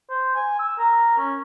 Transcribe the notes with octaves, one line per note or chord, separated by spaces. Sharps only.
C5
G#5
E6
A#4
C#4